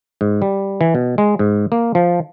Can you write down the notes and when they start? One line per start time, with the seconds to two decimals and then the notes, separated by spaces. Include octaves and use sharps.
0.21 G#2
0.42 G3
0.81 E3
0.95 B2
1.18 G#3
1.39 G#2
1.72 A#3
1.95 F3